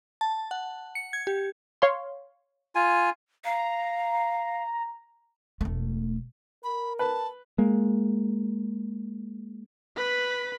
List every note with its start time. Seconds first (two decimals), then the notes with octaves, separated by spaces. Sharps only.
0.21 A5
0.51 F#5
0.95 C#7
1.13 G#6
1.27 G4
1.82 C#5 F5 C6
2.75 F4 G#5
3.44 F5 A#5
5.61 E1 A3
6.64 A#4 B5
6.99 B4 A5
7.58 G#3 A#3
9.97 B4 B5